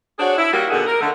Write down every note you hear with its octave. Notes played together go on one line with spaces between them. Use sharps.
D4 F#4 G#4 C5 C#5
E4
G3 A#3 F#4
B2 D3 D#3 G#4 F#5
A#4
D3 A3